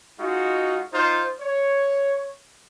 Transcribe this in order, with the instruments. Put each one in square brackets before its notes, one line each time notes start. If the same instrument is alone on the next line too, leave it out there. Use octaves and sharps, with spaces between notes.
[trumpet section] G#3 D#4 F4 F#4
D#4 F4 C5
C#5